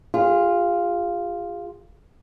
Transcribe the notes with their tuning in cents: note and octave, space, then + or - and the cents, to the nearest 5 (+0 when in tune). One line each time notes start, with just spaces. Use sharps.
F4 +0 G#4 -40